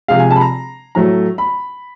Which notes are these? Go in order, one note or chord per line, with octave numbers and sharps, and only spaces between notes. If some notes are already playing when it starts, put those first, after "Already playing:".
C3 F3 G#3 F5
G#5
A5
B5
A#5
A2 F#3 A3 A#5
B5